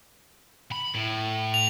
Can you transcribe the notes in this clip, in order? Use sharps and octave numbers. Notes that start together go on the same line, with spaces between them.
B5
A2
F7